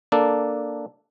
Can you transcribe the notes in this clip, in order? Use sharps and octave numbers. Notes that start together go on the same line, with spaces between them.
A#3 D4 A4